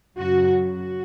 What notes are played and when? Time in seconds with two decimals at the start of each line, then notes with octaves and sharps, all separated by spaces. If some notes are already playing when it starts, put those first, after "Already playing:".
0.16 F#2 C#3 F#3 F#4
0.60 F#4